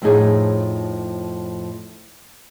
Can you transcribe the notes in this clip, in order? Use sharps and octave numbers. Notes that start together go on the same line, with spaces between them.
F2 A2 F3 D#4 G#4 C#5